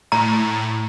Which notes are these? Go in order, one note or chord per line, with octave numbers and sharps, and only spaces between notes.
A2 A#5